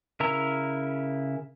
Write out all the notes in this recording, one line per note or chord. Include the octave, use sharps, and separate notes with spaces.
C#3 E4 A#4 A#5 E6